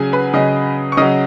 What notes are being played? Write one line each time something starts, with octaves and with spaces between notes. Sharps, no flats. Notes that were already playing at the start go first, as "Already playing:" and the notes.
Already playing: C#3 F#3 G#4 F#5 G#5
B4 B5
C#3 F#3 D#5 D#6
C#6
C#3 F#3 D#5 D#6